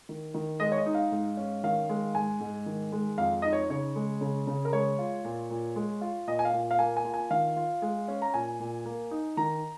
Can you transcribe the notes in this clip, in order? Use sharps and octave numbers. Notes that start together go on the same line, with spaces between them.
D#3
D#3
G#3 D#5
C#5
D#5
D#4
F5
G#2
C#4
D#3 F5
G#3
G#2 G#5
G#2
D#3
G#3
F2 F5
D#4 D#5
C#5
C#3 C#5
G#3
C#3
C#3
A#4
G#3 C#5
F4
A#2
A#2
G#3
F4
A#2 D#5
G#5
F5
A#2
F5
A#3 G#5
G#5
F4
G#5
D#3 F5
F4
G#3
C#4
A#5
A#2 G#5
A#2
A#3
D#4
D#3 A#5